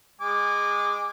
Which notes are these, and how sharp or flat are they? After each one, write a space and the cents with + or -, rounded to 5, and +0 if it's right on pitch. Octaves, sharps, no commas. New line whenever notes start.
G#3 -20 G#5 -25 D6 +0